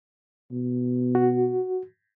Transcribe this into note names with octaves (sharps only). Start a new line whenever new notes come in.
B2
F#4